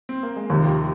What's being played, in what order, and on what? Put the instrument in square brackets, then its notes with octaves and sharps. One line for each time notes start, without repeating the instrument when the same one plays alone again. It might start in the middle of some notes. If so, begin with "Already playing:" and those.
[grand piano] C4
A#3
G#3
[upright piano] D#2 [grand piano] C3 F3